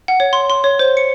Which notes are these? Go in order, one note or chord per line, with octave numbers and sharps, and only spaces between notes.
F#5
C#5
C6
C6
C#5
C5
C#7